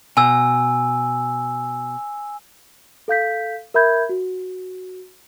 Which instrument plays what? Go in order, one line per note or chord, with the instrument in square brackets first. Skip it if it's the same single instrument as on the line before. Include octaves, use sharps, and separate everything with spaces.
[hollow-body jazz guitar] B2 [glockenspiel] G#5 E6
[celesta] A4 F5 G6 B6
A#4 E5 B5 G6 G#6
F#4